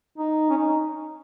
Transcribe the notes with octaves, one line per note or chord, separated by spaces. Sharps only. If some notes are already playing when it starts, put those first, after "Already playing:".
D#4
C#4
D#4